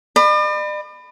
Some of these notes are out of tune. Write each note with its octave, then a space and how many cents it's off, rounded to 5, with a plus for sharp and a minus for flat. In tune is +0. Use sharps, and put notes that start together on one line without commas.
D5 +45 B5 +15